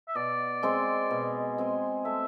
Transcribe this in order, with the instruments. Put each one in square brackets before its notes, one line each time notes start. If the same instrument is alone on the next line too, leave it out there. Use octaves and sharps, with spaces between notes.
[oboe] E5
[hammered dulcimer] B2 [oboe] D5
[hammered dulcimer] G#3 C4 G#4
B2
G#3 C4 G#4
[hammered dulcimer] A3 [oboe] E5